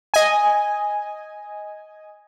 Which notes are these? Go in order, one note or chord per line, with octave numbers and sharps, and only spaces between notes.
D#5 G#5